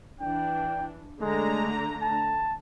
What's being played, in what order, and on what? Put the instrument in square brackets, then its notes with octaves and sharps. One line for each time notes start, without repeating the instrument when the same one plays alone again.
[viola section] E3 D4 [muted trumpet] G5
[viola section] D3 A3 A#5 [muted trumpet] G#3
[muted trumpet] A5